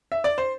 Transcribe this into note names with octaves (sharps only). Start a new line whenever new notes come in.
E5
D5
C5